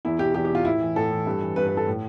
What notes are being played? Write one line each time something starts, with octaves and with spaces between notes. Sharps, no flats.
E2 E4
B2 G4
E2 G4
G4
B2 F4
A2 E4
E3
A2 A4
E3
G2
E3
G2 B4
B4
E3 A4
A2